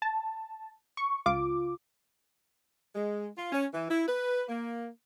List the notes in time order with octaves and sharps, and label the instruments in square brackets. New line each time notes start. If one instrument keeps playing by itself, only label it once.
[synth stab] A5
C#6
C#2 F4 D6
[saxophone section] G#3
F4
C#4
E3
E4
B4
A#3